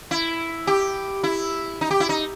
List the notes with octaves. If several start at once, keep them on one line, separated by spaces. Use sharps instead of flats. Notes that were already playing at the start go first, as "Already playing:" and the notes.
E4
G4
E4
D#4
G4
E4
D#4